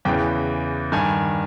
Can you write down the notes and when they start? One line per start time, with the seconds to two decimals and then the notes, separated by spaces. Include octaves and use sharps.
0.05 E2 C#3 E3 G5
0.92 G2 D#3 G#5